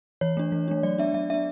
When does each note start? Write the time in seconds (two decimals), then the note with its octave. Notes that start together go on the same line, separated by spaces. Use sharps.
0.21 E3 C#5
0.37 A3 D4
0.52 E3
0.68 A3 D4
0.83 F#3 D5
0.98 B3 D4 E5
1.14 F#3 E5
1.30 B3 D4 E5